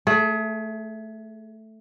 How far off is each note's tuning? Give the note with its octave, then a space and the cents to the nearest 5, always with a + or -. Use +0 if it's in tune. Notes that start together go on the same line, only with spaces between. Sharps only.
A3 +0 G#4 +30